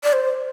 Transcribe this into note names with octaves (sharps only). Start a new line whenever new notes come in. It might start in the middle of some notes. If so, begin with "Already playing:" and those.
D5
C5